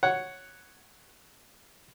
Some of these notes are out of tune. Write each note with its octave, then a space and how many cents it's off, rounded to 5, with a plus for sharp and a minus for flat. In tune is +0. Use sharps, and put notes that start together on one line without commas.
C#5 -5 F#5 +0